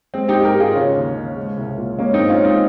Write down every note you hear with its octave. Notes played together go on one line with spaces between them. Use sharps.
G#3 C4
D#4 G4
G#2
G4 A#4
G#2
F4 G#4
C#3 C#4 F4
D#2
C#3
G#3
C2
A#2
G#3 A#3 C#4
G2 C4 D#4
C#4 F4
G#3
C4 D#4